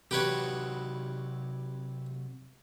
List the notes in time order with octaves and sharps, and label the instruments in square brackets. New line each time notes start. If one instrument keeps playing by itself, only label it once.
[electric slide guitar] C3 F#3 F#4 [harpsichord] G4 B4 C#5